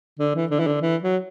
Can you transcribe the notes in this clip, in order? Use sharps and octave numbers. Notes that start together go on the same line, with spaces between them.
D3
E3
D3
E3
D3
E3
F#3